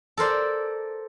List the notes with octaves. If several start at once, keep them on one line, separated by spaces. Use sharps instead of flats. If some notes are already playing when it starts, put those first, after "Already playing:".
A4 A#4 C5 D5